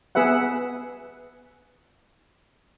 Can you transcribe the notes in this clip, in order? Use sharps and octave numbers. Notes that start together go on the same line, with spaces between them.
B3 G#4 B4 E5 F#5